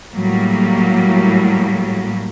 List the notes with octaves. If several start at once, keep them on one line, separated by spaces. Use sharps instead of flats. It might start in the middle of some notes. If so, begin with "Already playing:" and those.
A2 F#3 G3 A#3